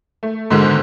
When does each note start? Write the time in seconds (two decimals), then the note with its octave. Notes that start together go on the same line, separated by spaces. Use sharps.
0.23 A3
0.50 G#2 B2 D3 D#3 G#3